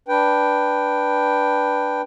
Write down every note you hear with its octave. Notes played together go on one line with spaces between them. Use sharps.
D4 B4 G5